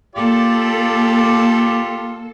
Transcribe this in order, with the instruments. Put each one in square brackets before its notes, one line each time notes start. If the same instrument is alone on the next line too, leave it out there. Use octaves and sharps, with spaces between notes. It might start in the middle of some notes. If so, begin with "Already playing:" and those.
[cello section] A#3 A4 [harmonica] F4 G4 D5